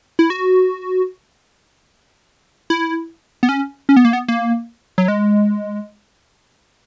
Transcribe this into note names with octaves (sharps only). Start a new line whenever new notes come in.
E4
F#4
E4
B3
C#4
C#4
B3
A#3
B3
A#3
F#3
G#3